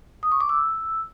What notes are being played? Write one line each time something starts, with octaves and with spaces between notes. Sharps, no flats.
D#6
C#6
D6
E6